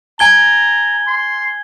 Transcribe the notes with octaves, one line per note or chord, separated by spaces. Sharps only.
G#5 A#5 G#6 G7
C6